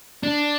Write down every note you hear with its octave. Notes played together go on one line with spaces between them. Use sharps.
D4